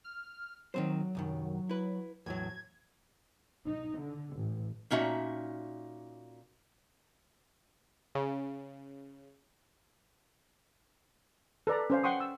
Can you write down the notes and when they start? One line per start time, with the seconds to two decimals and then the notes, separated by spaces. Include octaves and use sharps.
0.04 F6
0.74 D#3 F#3 C4 C5
1.15 C2 F#2 D#3
1.69 E4 B4
2.26 E2 A2 F#3 G#6
3.68 D#4
3.99 D3
4.35 A1
4.90 A#2 C#4 D#4 F#4 E5
8.15 C#3
11.67 A4 B4 D5 A#5
11.90 C#4 C5 F5
12.03 F#5 G5 C6 C#6 D#6
12.20 E6